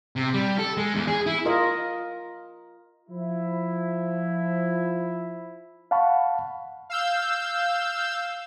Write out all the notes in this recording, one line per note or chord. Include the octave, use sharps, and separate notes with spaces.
C3
G3
A4
G#3
E2
G#4
E4
F4 A#4 D#5
F3 E4
F5 F#5 A5 B5 C#6
F5 E6 G6